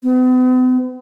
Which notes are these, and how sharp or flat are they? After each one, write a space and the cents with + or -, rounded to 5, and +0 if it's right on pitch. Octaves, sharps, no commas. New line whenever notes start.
B3 +45